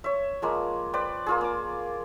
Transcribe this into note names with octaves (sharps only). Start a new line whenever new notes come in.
C#5 E5
F3 G#3 A#3
B4 C5 D5 G5
A#3 F4 G#4
A#3 D6